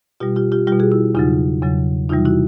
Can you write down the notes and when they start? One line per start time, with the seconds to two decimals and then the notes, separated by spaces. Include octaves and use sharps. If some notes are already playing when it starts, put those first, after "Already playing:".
0.20 B2 G3 F4 G4
0.36 F4 G4
0.52 F4 G4
0.67 B2 G3 F4 G4
0.80 F#4 G#4
0.92 E4
1.15 E2 C#3 F#3 D#4 F4
1.62 E2 C#3 F#3
2.09 E2 C3 E3 G3 D#4 F4
2.25 E4 F#4